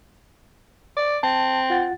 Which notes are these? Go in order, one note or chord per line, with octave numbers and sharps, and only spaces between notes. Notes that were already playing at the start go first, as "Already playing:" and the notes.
D5
C4 A5
F4 F#5 A6